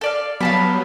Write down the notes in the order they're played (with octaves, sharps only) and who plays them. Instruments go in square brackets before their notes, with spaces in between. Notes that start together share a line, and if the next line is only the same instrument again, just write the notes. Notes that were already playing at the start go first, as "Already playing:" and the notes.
[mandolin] A4 D5 F5
[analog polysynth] F#3 G3 B3 [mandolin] F5 A5 B5